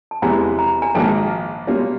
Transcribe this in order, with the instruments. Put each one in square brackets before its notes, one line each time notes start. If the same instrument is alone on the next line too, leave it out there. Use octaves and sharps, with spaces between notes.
[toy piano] A5
[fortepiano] E2 C3 E3 G#3 B3 [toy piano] G#5 A#5
[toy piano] A#5
G#5 A#5
[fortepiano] A#1 G#2 D#3 F#3 A#3 [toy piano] G5 A5
[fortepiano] B2 G3 A#3 C#4 F4